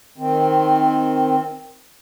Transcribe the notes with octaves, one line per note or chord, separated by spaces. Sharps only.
D#3 C4